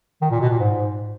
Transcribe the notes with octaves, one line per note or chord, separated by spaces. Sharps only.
D#3
A#2
B2
A#2
G#2